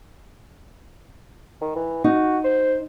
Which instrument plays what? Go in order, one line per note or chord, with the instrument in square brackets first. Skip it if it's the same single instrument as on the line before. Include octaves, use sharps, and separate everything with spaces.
[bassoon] D#3
E3
[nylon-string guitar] D#4 [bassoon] F#4
[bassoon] C5